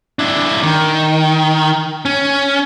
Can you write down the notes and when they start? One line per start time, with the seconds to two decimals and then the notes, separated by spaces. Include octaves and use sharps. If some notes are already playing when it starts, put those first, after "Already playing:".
0.19 D4 E4
0.63 D#3
2.05 C#4